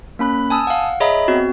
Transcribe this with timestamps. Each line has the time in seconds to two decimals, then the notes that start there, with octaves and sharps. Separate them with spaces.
0.19 A#3 C#4 B5 F#6
0.50 G#5 A5 D#6 E6
0.67 F5 F#5
1.00 G#4 C#5 D#5 E5 A#5 B5
1.28 B3 C4 F#4